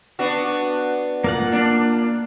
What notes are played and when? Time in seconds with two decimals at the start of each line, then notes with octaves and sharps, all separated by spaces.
0.19 B3 D4 F#4
1.24 A#3 F4 F#5
1.52 D4